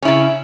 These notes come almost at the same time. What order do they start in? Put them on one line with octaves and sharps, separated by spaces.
C#4 E4 C#3